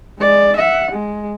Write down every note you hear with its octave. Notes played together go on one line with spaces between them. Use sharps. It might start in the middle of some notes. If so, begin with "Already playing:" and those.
G#3 D5
E5 F#5
G#3